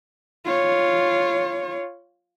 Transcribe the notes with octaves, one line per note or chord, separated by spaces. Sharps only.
F4 C#5